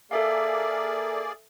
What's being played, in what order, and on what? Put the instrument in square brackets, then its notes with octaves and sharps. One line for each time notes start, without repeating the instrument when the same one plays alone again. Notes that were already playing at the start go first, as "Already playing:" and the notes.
[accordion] A#3 G#4 D5 [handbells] A4 E5 F5